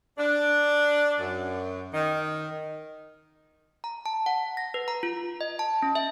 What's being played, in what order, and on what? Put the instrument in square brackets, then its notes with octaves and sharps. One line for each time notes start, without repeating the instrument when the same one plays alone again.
[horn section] D4
F#2
D#3
[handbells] A#5
A5
F#5
A#6
B4
A#5
F4
D#5
A5
C#4
E5